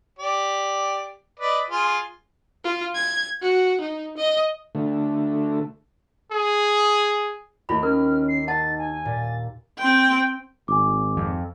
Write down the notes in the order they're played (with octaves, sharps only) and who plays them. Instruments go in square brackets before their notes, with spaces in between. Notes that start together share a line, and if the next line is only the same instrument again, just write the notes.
[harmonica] G4 D5
B4 D5 D#5
F4 G#4 G#5
[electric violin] F4
G#6
F#4
D#4
D#5
[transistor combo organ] D3 A3
[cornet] G#4
[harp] D#2 [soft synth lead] A3 [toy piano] E4 F4 B5
[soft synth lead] C#4 [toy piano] A#4 [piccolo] F6
[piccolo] C7
[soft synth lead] D#4 [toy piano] F#5 A5 [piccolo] A6
[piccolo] G#5
[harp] A#2 [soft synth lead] A6
[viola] C4 G5
[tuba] G#1 [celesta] G#5 D6
[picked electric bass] F2